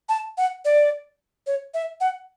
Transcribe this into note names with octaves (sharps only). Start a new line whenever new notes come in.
A5
F#5
D5
C#5
E5
F#5